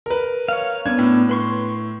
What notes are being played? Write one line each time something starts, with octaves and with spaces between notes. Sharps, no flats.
A#4 B4
C#5 F5
B3 C#4 D4 G#6
A2
B4 C6 C#6